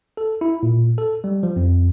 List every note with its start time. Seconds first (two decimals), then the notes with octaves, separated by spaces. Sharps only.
0.17 A4
0.41 E4
0.63 A#2
0.98 A4
1.24 G3
1.43 F3
1.56 F2